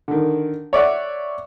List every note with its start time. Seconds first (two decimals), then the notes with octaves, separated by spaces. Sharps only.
0.08 D3 D#3
0.73 C#5 D5 E5 F#5